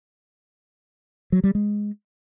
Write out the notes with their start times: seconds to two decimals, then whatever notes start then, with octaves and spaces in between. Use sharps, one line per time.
1.32 F#3
1.44 G3
1.55 G#3